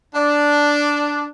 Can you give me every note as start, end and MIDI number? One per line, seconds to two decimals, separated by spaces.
0.14 1.26 62